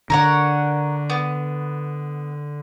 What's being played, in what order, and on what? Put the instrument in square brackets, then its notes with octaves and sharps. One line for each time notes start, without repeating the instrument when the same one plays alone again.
[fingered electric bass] D3 [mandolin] A#4 C#5 F#5
[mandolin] B3